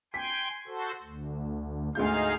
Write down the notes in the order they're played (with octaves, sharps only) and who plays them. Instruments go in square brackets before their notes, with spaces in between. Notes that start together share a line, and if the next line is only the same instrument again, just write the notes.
[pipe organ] G5 G#5 C6 [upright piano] B6
[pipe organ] F#4 A4 C5
D2
[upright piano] D2 G#2 G6 [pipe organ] D#4 G#4 F5